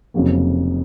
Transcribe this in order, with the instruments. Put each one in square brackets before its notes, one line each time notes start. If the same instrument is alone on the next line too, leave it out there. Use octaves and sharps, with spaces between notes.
[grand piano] F1 F2 C#3 F#3 A#3